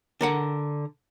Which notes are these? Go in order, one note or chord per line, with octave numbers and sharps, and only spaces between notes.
D3 A#4 F#5